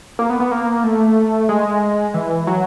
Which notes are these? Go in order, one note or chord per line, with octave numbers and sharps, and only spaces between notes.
A#3
B3
B3
A#3
A3
G#3
E3
F#3